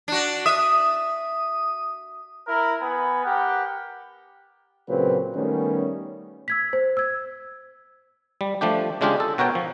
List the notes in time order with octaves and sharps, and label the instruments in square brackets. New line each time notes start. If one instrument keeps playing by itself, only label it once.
[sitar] D4 F#4
[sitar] E5 [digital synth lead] D#6
[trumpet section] E4 A#4
B3 G#5 B5
G4 A#4 F#5
[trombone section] A#2 C#3 F#3 C4 B4 C5
D#3 G3 A3 B3 C#4
[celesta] E6 G#6 B6
C5
E6 G#6
[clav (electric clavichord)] G3
F3 A3 D4 G4
C#3 G#3 D4 F4 G4 G#4
A4
B2 F#4 A#4 C#5 G5
F3